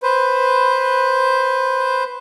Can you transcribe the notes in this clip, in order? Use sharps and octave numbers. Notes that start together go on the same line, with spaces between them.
B4 C5